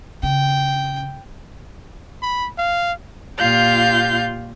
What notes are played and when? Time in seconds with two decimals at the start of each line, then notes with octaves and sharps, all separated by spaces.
0.23 C#3 G5
2.22 B5
2.58 F5
3.37 A#2 F4 G4 F5 G6